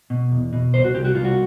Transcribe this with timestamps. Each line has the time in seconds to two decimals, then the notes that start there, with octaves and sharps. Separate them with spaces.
0.10 B2
0.32 E2
0.53 B2
0.73 C2 C5
0.84 F#4
0.94 C2 G4
1.05 F#4
1.15 C2 F4
1.25 F#4